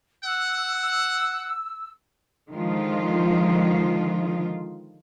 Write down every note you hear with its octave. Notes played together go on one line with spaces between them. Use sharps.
F#5 E6
D3 D#3 F3 G#3 F4